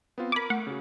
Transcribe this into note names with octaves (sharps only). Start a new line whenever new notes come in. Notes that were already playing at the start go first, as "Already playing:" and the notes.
B3 C4 F4
A#4 B5 D6 G#6 D#7
A3 F#5
C#3 F#4